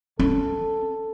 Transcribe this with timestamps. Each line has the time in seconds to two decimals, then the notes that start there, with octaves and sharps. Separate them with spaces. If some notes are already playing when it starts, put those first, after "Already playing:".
0.19 C#4 A4